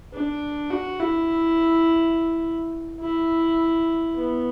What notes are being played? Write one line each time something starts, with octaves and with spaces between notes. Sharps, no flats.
D4
F#4
E4
E4
B3